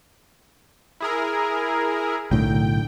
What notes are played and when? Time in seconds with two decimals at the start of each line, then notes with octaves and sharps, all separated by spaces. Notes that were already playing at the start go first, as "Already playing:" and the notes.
1.01 E4 G#4 A#4
2.31 B1 A2 D3 G5